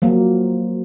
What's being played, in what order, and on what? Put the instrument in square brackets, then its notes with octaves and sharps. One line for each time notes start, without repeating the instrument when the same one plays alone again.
[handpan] F3 F#3 A#3